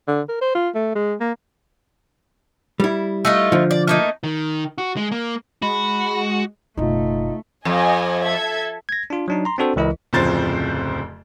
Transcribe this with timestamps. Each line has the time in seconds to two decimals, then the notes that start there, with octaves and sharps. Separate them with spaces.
0.08 D3
0.29 A#4
0.41 C5
0.55 F4
0.75 A3
0.95 G#3
1.20 A#3
2.80 G3 E4
3.25 A3 D#4 F4
3.52 D3 F3
3.71 D5
3.88 A3 A#3 D#4
4.24 D#3
4.78 F#4
4.97 G#3
5.12 A#3
5.62 G#3 F#4 B5
6.77 F#1 B2 A3 D#4 F4
7.65 F2 D#5 G#5
8.21 A4 E5 G#6
8.89 G#6 A#6
9.10 D4 F4
9.28 F#3 D4 D#4
9.45 A#5 C6
9.58 C4 D4 F#4 A4 C5
9.76 C#2 E3 E4 A#4 D#5
10.13 D1 F2 C#3 F3 C5 A6